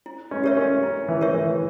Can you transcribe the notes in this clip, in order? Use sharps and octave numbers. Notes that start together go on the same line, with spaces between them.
E4
C#4
G4 A#4 C#5 E5
C#4
E4
E3
G4 A#4 C#5 E5
E3